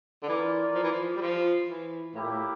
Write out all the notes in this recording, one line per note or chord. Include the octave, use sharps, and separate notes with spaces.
D3
E3 A#3 F4 A#4 D5
F3
E3
F3
G3
F3
E3
A2 A#3 E4 G4
A#2
A2